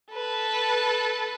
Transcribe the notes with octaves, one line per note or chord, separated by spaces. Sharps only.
A4 B4